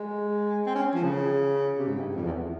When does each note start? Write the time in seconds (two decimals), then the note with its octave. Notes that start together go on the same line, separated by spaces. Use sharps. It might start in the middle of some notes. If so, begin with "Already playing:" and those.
Already playing: G#3
0.66 C4
0.75 C#4
0.94 F3
1.03 C#3
1.78 C3
1.88 G#2
1.98 G2
2.16 F2
2.25 E2